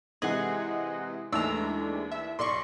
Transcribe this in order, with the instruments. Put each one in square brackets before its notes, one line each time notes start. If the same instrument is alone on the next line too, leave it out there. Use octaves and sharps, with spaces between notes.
[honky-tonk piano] C3 E3 G#3 [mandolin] G#4 [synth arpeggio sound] D#5 F#5
[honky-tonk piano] D#2 E3 [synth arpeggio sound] G#3 A3 D4 [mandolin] A#5 E6
[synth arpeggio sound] E5
[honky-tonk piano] B1 D5 [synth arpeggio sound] C6 C#6